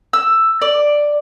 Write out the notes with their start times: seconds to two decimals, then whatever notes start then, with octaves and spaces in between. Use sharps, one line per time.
0.13 E6
0.61 D5